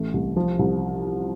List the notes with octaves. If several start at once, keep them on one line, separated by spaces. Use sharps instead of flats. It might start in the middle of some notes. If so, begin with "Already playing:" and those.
Already playing: A1 A3
C2
F3
C2